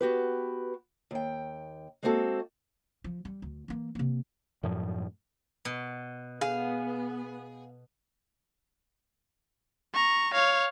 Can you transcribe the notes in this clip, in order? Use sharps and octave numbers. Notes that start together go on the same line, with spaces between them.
B3 F#4 G4 B4
D#2 G5
G#3 A#3 C4 F#4 A4
F3
G3
D2
E3 A#3
C3 A#3
F#2 A2 F3
B2
B3 G#4 F5
A#5 C#6
C#5 F5